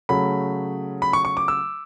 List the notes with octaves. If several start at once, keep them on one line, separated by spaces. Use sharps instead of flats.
C#3 F#3 A3 B5
B5
C#6
C#6
D6
E6